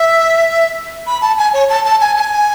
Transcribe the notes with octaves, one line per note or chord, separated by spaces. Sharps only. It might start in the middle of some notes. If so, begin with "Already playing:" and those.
Already playing: E5
B5
A5
G#5
C#5
A5
A5
G#5
A5
G#5